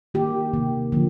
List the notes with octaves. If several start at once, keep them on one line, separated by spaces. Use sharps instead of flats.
D#3 A#3 G4
C3 D#3 A#3
D3 F3 A#3